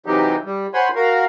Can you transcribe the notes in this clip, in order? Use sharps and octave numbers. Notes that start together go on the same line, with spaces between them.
C3 E3 F#3 D#4 G4
G3
C5 C#5 F#5 G#5 B5 C6
F#4 A#4 F5